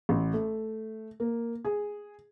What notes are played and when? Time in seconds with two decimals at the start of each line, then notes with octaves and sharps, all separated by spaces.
0.09 A1
0.33 A3
1.20 A#3
1.65 G#4